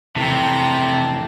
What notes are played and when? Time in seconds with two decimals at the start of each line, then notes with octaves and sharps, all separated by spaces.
0.16 F2 C3 E3 A3 G5 A5 A#5
0.60 A5